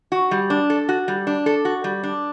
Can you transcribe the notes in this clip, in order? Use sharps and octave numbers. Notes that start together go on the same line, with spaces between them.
F#4
G3
D4
A4
F#4
G3
D4
A4
F#4
G3
D4